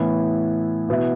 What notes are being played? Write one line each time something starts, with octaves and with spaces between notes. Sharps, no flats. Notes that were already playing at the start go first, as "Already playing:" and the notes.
Already playing: A2 E3 B3 E4
B2 B3 E4